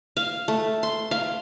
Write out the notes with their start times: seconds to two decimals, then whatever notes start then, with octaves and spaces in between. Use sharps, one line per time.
0.17 F5
0.48 A3
0.83 C6
1.11 F5